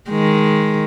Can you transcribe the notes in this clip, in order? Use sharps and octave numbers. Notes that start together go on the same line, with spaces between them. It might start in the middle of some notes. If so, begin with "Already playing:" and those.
D#3 G#3